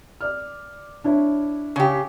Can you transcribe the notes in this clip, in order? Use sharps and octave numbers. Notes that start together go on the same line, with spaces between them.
D5 F6
D4 E4 C#5
C#3 G4